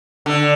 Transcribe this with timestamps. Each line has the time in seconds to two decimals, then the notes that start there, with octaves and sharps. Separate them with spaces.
0.26 D3